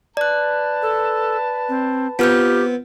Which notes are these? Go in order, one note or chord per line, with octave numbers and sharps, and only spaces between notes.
B4 D5 A5 F#6
A4
C4
B3 C4 F4 G4 F6 G6